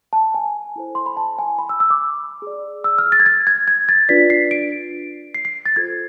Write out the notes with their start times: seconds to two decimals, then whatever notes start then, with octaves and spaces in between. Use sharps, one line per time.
0.13 A5
0.34 G#5
0.76 E4 A4 C5
0.95 C6
1.06 B5
1.17 A5
1.39 G#5
1.59 B5
1.69 E6
1.80 E6
1.90 D6
2.42 G#4 D5
2.84 E6
2.99 F6
3.12 A6
3.20 G#6
3.26 A6
3.47 G#6
3.68 G#6
3.89 A6
4.09 D4 F4 B4 D5 B6
4.30 C7
4.51 D7
5.35 C7
5.45 C7
5.66 A6
5.76 F4 A4 C5 G#6